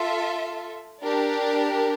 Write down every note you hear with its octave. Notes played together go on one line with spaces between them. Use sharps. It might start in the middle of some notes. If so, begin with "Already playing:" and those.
Already playing: F4 A4 E5
D4 G4 A#4